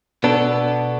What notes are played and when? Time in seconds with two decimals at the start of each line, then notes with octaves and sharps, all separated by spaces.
0.24 B2 B3 D4 A4